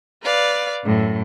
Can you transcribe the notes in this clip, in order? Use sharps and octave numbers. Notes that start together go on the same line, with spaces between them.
B4 D5 F5
F#2 A2